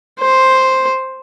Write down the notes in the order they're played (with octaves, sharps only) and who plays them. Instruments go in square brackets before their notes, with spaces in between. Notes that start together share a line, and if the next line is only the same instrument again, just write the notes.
[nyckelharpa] C5